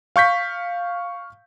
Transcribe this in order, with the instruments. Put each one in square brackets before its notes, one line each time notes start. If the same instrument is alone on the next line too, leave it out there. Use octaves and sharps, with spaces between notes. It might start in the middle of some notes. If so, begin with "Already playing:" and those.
[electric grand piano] F5 C#6 G6 B6